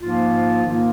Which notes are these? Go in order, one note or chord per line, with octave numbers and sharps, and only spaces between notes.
G#2 F3 A#3 F4
G#2 D#3 A#3 F4